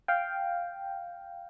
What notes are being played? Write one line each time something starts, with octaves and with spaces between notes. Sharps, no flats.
F5 G5